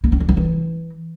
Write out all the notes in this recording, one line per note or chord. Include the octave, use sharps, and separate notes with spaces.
A#3
C#4
D4
F3
E3